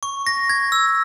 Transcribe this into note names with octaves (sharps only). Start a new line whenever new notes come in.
C#6
A#6
G#6
E6